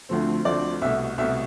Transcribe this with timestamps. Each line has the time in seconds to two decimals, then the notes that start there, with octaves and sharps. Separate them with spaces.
0.09 D2 D3 F3 A3 C4
0.45 D2 D3 F3 A3 C4 D5
0.82 C2 B2 A3 E5
1.18 C2 B2 A3 E5